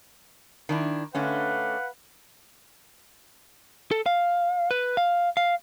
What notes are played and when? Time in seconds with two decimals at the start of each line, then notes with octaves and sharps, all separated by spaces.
0.69 D#3 D4 E4
1.15 D3 A3 C#4 B4 F5 F#5
3.91 A4
4.06 F5
4.71 B4
4.97 F5
5.37 F5